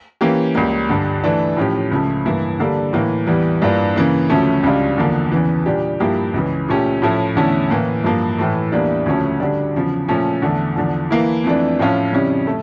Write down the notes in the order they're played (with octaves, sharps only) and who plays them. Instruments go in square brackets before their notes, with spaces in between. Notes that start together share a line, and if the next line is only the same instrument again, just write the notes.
[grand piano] E3 A#3 C#4 G4
C#2 C#3 G3 A#3
G2 D3 G3
E3 A3 D4
A2 F3 C#4 G4
C#2 C#3 F3 A3
G2 E3 A#3 E4
D3 G3 A#3 D4 A4
A2 E3 A#3
E2 E3 G3
G2 E3 A#3 D4 F4
C#3 E3 A#3
D2 C#3 F3 A3 C#4
C#2 C#3 G3 D4 F4
E2 D3 F3 A#3
E2 C#3 E3
A#2 G3 D4 G4
G2 F3 A#3 E4 G4
C#2 C#3 E3
A#2 A3 C#4 G4
A2 F3 C#4 E4 A4
E2 D3 A3 C#4 E4
A2 E3 A#3
G2 F3 A#3
A2 E3 A3
E2 E3 G3 A#3 D4
D2 C#3 F3 A3 C#4
D3 G3 D4
E2 C#3 F3
A#2 F3 A3 C#4
E2 D3 A3
E2 D3 F3
E3 A#3 E4
F2 E3 A3 D4
A2 F3 A3 C#4 F4
F2 C#3 G3 C#4 E4
A3 A4